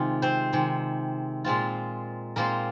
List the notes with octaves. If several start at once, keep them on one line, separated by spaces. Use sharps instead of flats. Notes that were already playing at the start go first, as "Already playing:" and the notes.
Already playing: C3 D#3 G#3 F4
C4 C5
C3 D#3 G#3
A#2 G#3 C4 F4
A#2 G#3 A#3 C4 F4 A#4